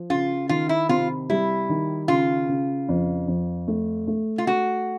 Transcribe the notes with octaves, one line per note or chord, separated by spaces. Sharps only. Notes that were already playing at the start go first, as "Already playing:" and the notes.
Already playing: F3
C#3 F4
D#3 F4
E4
C3 F4
G3 E4
D#3
C#3 F4
C#3
F2
F2
A3
A3
F4
A3 F#4